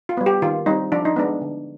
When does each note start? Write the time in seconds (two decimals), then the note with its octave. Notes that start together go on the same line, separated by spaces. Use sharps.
0.09 F4
0.17 G3 B3
0.26 G4
0.42 D#3 F4
0.66 G3 C4 D#4
0.92 F3 D4
1.05 D#4
1.16 G#3 B3 D4
1.41 D3